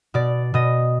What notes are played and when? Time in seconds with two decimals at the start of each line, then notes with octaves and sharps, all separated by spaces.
0.14 B2 D5
0.54 B2 D#5